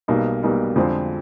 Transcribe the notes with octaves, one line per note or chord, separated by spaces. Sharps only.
B1 B2 G3 A#3 D#4
B1 B2 G3 A#3 D#4
F2 D3 F3 G#3 C4